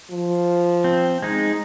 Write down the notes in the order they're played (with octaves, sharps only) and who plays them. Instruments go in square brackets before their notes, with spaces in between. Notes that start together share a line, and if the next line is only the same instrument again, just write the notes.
[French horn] F3
[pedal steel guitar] C4
G#3 D#4